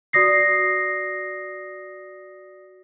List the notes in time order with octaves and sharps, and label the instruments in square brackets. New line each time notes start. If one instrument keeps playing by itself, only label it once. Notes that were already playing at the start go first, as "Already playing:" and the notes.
[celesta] F#4 D5 D#6 A#6 C7